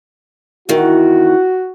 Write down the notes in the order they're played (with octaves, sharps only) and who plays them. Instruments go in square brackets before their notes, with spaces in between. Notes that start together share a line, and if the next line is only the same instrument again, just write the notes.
[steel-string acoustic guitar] E2 D#3 [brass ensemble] F#4